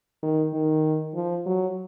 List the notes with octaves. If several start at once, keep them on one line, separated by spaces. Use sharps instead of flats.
D#3
D#3
F3
F#3